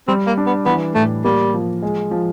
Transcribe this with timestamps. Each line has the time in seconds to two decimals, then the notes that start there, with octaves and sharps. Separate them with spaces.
0.08 G3 C4
0.27 A#3
0.37 D4
0.47 B3
0.66 E3 B3
0.95 A2 A3
1.24 G3 A#3
1.54 F3
1.83 G#3
2.11 F3